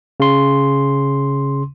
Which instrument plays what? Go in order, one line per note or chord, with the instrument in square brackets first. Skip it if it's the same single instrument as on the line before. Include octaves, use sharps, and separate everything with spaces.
[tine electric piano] C#3 C6